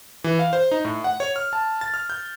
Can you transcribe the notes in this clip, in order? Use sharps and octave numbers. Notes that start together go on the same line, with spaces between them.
E3
F5
C5
D#4
A2
F#5
C#5
F6
A5
A6
F6
G6